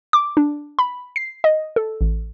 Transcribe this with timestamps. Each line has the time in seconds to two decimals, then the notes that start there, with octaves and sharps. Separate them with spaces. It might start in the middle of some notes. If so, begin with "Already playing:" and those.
0.13 D6
0.37 D4
0.79 B5
1.16 C7
1.44 D#5
1.76 A4
2.01 A1